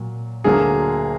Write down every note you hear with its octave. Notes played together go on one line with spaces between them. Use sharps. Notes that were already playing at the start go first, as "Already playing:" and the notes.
Already playing: A#2 F#3
D2 D3 F#3 A#3 G#4 A#4